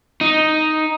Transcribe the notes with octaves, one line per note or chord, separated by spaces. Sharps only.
D#4